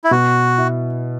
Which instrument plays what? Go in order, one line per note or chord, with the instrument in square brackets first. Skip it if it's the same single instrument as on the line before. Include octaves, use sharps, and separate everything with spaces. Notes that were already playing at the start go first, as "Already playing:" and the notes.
[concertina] E4
[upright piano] B2 [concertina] F#4
[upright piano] E4